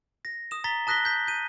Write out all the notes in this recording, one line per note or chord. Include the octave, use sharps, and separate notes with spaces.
A#6
D#6 E7
A#5 A6 B6 G7
A5 D#6 F#6 A#6 B6 G7
G6 B6
G6 D#7